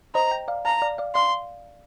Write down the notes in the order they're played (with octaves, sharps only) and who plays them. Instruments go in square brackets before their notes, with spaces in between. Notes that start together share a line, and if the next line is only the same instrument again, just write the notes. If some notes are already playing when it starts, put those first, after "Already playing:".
[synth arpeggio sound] C5 D#5 [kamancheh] A#5
[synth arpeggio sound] G5 A#5
D5 F5
[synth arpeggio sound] F5 A5 [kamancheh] A#5
[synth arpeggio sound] D5 F5
D5 F5
[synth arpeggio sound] D5 F5 [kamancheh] C6